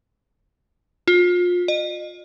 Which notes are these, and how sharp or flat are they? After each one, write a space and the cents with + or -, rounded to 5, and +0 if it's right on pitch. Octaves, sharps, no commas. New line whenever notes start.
F4 +30
D#5 -35